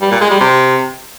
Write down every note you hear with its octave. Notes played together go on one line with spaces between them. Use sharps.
G3
A#2
G#3
G3
C3